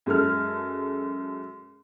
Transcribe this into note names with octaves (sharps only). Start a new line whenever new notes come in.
F#2 G#3 C#4 A4 F6